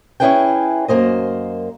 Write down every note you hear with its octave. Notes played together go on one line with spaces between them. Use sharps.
C#4 D#4 E4 G#4 B4 G5
F#2 A#3 C5 D#5